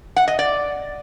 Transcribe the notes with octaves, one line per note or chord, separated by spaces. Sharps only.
F#5
D#5
D5